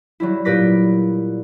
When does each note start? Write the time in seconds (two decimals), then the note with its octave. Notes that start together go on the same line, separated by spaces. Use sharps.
0.20 F#3 G3 E4
0.45 A#2 G4 B4 D6 A#6 B6